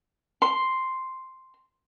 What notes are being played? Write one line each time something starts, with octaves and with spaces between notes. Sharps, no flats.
C6